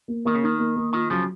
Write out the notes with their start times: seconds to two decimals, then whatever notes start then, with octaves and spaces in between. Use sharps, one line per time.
0.08 A#3
0.25 D#3 A#3
0.35 C#3
0.43 D#3 D#4
0.59 A#3
0.76 A#3
0.93 D#3 F4
1.10 C#3 F3 F#3